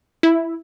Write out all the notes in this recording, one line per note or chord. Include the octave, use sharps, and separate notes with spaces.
E4